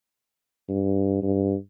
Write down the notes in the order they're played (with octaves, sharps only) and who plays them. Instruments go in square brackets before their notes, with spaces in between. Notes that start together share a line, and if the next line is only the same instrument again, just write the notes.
[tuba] G2
G2